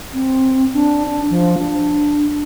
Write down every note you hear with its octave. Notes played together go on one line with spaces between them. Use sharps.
C4
D4
D4
F3
D4